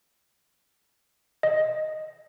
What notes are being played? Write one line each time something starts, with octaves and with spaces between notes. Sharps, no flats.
D#5